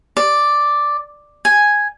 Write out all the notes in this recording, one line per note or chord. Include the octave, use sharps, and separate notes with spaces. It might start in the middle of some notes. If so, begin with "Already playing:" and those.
D5
G#5